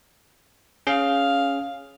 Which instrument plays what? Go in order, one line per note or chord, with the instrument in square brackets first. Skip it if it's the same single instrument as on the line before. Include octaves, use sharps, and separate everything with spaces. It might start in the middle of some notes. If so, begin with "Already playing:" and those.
[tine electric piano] C#4 G#4 [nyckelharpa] F5